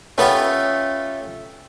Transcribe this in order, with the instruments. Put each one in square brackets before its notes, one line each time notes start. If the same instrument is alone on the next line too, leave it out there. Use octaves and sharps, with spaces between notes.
[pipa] A3 B3 [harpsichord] C#4 F4 G4